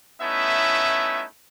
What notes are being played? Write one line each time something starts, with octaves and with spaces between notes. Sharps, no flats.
A3 B3 C#4 D#4 E4 E5